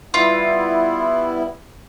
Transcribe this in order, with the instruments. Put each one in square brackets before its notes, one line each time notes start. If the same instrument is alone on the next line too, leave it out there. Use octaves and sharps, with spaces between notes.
[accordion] G3 B3 E4 [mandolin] F4